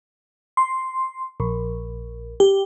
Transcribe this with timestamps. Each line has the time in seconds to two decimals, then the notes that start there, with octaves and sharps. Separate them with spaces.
0.57 C6
1.40 A#1
2.40 G4